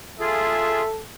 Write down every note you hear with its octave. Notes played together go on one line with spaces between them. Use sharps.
F4 G#4 A4 E5